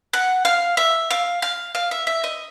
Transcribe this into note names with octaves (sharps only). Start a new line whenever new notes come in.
F#5
F5
E5
F5
F5
F5
E5
E5
D#5